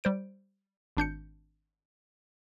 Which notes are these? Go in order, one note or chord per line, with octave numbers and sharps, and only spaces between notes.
G3 C5 D7
G#1 D4 G6 C#7